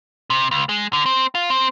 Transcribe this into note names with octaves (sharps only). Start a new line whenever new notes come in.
C3
C#2
G#3
D3
C4
F4
C4